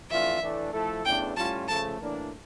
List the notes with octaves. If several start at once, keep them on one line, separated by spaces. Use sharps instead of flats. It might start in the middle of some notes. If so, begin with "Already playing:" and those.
F2 E3 A3 D4 F4 E5
A2 E3 A3 D4
F3 A3 E4 A4
E2 C#3 E3 A3 D4 G5
A2 G3 C#4 F4 A5
C#3 F3 A3 A5
A2 E3 A#3 D4